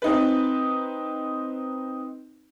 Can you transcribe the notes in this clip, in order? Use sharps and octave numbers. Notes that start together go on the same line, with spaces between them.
C4 D#4 B4